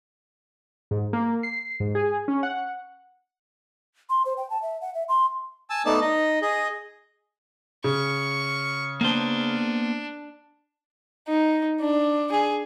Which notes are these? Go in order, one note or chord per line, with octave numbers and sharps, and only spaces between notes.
G#2
A#3
C7
G#2
G#4
C#4
F#5
C6
C5
G5
A5
E5
F#5
E5
C6
G#5 A5 E6
A3 B3 D#4 D5 A5
D#4 D#5
G#4 D#5
C#3 C#6
A#3 B3 D4 C5
D#4
D4
G#4